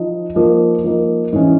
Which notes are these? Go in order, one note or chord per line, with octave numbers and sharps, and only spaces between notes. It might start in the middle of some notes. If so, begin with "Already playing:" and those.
Already playing: F3 D#4
F3 A#3 D#4
F3 A#3 D#4
G#2 E3 G#3 C#4